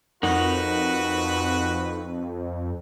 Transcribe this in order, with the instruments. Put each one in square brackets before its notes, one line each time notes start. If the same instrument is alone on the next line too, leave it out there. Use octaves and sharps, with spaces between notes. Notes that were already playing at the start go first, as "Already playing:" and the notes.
[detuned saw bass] F2 [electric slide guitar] D#4 A#4 F#5 [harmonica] F#4 B4